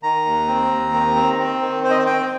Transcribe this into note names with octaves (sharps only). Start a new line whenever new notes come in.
D#3 A#5
D#2
C4
D#2
D#3
C4
C4
D#3
C4 C5
D#5
C5
C4 G5